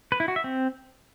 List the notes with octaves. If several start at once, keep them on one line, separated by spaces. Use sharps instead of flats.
B4
E4
F#4
E5
C4